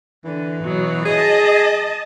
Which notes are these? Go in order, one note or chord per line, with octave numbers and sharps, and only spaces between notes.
D3 E3
B2 F#3
G#4 D#5 A5